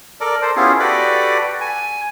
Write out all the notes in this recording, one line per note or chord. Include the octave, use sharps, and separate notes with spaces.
A4 A#4 D5
A4 C5
B3 C#4 E4 F4 G4 G#4
F#4 G4 A4 B4 D5
G#5